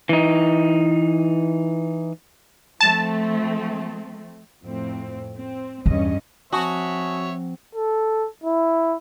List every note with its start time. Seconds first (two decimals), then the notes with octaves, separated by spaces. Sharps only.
0.09 E3 D#4
2.81 F3 A3 C4 A5
4.63 F2 A2 C4
5.35 C4
5.86 E2 G2 C#4 D#5
6.53 F3 C4 F#4 C#5 E5 G#5 A5 D#6
7.75 A4
8.44 E4